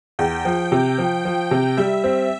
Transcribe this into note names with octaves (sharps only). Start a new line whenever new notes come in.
E2 G5
F3
C3
F3
F3
C3
G3 E5
C4